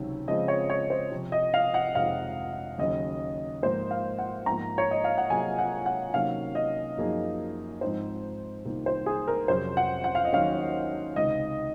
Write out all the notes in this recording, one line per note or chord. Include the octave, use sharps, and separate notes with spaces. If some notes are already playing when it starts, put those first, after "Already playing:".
Already playing: C#2 C3 D#3 F#3 C#4
C#3 F3 G#3 C4 F4 D#5
C#5
C#5
C5
C3 F3 C4
D#5
F5
F#5
F2 C3 D#3 G#3 D#4 F5
D#2 C#3 F#3 C#4 D#5
G#2 F3 A#3 C5
F5
F#5
G#2 F3 A#3 A#5
C#5
D#5
F5
F#5
C3 F#3 A#3 F4 G#4 G#5
F#5
F#5
C3 D#3 F#3 A#3 C#4 F5
D#5
F#2 F3 A#3 D#4 G#4
G#2 F3 C4 D#4 C5
C2 C3 D#3 A#3 F4
C5
G#4
A#4
F2 C3 F#3 C#4 G#4 C5
F#5
F#5
F5
D#5
D#2 D#3 F#3 C#4 F5
C#2 C3 D#3 D#5